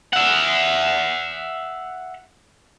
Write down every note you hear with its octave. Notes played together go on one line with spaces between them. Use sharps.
E5 F#5